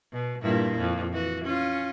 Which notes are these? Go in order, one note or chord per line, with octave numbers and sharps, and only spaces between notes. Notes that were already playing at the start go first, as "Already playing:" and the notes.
B2
G2 A#2 E4
F2
E3 F#4
C#4 F4